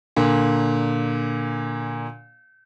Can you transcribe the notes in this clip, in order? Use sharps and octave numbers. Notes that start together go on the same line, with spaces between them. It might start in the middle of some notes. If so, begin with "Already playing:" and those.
A#2 D3